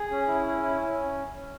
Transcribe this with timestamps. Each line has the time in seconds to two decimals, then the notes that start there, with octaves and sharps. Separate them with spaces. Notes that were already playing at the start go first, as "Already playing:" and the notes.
Already playing: G#4
0.11 C#4
0.28 E4
0.45 C#4
0.63 E4
0.81 C#4